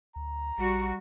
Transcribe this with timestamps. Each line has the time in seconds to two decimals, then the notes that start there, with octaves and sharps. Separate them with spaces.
0.16 D2 A#5
0.58 A#1 G3 F#4